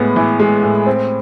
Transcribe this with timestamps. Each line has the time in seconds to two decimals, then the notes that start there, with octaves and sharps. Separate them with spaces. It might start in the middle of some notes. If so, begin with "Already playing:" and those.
Already playing: A2 E3 G#3 B3
0.16 E3
0.40 G#3
0.63 A2
0.86 C4